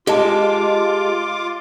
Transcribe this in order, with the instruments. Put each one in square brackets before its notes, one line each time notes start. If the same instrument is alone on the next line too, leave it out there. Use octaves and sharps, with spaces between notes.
[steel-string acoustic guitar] G#3 [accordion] F4 D6 [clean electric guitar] G4 D#5 A5